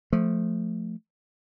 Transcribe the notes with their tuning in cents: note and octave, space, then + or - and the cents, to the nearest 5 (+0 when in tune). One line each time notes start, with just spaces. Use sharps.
F3 +10 A3 +0